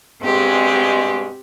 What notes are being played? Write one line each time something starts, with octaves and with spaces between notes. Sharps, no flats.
G2 B2 G#3 C4 G4